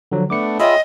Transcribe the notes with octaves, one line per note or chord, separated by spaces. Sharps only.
D3 F3 F#3
A3 B3 D4 D6 C#7
F4 G#4 C#5 D#5 E5 G5 B5